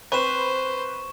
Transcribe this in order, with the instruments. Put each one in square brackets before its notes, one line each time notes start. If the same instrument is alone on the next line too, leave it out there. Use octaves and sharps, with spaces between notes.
[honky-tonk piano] C4 B4 [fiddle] C5 [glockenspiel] C#6 E7